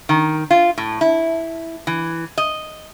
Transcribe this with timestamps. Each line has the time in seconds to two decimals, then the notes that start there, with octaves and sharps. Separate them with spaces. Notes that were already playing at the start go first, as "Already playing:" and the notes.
0.09 D#3
0.50 F4
0.78 A2
1.01 E4
1.87 E3
2.38 D#5